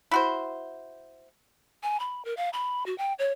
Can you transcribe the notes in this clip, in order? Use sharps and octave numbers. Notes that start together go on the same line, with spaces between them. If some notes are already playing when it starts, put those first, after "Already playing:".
E4 F#4 C5
G#5
B5
A#4
F5
B5
F#4
G5
C#5